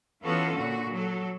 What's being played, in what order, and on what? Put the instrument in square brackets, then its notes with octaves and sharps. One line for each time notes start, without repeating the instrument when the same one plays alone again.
[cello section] E3 B3 C#4 F4 F#4 A4
A#2 D3 F#4
F#3 A4